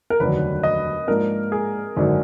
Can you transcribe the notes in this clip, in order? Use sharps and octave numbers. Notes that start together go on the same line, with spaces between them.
A#4
F1 D#2 D3 F#3 D4 B4
D#5
G#2 F3 A#3 D4 A#4
G#4
G#1 F#2 D3 F#3 D4